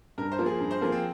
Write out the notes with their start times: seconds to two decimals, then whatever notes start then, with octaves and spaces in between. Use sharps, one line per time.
0.18 G2 A#4
0.32 C5
0.39 F3 A#3 F4
0.46 G#4
0.60 G2
0.71 C5
0.81 F3 A#3 F4 G#4
0.92 C4